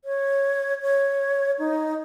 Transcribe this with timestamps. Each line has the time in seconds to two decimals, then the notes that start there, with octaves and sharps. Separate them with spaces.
0.05 C#5
0.82 C#5
1.59 D#4